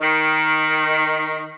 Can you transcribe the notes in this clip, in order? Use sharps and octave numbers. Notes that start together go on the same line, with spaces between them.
D#3